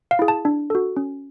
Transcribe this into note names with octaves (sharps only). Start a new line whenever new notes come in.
F5
E4 G#4
A5
D4
F#4 A4
C#4